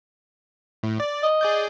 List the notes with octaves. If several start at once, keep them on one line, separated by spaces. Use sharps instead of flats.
A2
D5
D#5
G#4 D5 G6